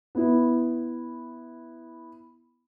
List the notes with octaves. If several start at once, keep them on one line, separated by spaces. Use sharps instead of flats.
B3 E4